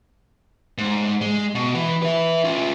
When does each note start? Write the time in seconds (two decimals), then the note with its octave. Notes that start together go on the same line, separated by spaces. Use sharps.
0.78 G#2
1.21 G#3
1.55 B2
1.74 E3
2.03 B4 E5
2.44 C#4 F4